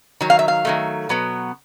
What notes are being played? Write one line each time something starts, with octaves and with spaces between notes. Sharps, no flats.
D#3 F#3
F5
E5
F5
D#3 F#3 A3
B2 F#3 B3